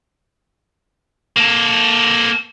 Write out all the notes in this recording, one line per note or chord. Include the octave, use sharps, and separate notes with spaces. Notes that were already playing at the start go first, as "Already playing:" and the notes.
A#3 A4